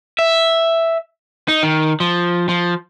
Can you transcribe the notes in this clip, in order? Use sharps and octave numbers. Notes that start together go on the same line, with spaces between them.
E5
D#4
D#3
F3
F3